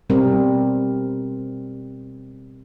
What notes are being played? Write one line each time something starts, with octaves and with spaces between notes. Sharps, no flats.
B2 G3 C4 A#4